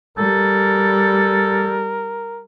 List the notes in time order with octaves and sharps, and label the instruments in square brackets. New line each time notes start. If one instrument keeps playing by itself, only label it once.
[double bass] G3 [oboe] A4 [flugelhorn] A#4